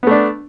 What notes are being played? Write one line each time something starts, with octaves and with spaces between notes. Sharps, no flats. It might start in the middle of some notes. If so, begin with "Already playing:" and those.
A3 B3 D4